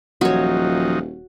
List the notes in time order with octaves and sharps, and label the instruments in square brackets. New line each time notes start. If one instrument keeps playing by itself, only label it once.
[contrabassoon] D#1 [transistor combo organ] F3 F#3 D#4 [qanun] F#4 C#5